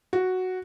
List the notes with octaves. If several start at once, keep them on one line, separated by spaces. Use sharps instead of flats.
F#4